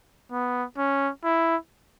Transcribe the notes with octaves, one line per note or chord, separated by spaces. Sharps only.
B3
C#4
E4